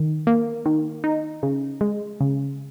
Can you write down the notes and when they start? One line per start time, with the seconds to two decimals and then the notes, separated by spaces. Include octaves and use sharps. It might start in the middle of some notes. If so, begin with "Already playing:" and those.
Already playing: D#3
0.27 A#3
0.66 D#3
1.04 D#4
1.43 C#3
1.81 G#3
2.21 C#3